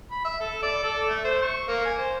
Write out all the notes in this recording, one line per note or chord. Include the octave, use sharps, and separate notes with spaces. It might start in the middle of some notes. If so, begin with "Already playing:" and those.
B5
E5
A4
D5
A4
A3
C5
C#6
A#3
G#5
C5